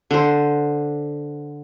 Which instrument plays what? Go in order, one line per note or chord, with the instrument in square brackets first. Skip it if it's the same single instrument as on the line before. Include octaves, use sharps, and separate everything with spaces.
[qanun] D3 C5